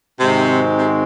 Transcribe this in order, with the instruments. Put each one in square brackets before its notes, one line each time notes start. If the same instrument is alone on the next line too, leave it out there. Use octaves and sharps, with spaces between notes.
[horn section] G#2 D#3 G#3 C4 F#4 [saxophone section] C3
[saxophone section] C3